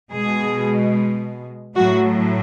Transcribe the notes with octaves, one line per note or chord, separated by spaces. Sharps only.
B2 G#3 G#4
A2 F#3 A3 F#4